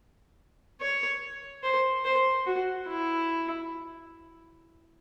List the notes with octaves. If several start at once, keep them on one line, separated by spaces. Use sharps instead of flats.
C#5
C5
C5
F#4
E4